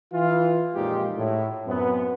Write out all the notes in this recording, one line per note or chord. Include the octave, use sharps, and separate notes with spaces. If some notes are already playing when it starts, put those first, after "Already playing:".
E3 F4
F2 A#2 G#3 D#4 F4 G4
A2
F#2 B3 C4